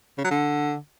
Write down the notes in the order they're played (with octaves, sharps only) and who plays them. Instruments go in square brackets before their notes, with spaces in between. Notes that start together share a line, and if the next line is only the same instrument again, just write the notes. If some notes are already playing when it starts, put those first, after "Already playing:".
[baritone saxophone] C#3
F#3
D3